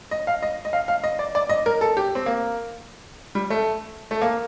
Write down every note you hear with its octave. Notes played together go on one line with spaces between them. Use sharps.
D#5
F5
D#5
D#5
F5
F5
D#5
D5
D5
D#5
A#4
A4
G4
C4
A#3
G3
A3
A3
A#3